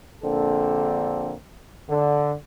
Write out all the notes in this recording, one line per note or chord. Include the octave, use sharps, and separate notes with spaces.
A#1 D3 A#3 C4 A4
D3